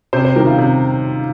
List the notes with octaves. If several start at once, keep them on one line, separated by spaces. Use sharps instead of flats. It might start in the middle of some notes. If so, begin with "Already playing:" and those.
C3 C5
C5
D#3 G3 A#4
F4
C3